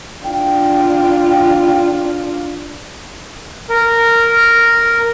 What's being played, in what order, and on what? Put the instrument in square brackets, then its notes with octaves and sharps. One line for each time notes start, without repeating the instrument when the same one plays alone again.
[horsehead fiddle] D4 F4 [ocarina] G5
[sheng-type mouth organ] A#4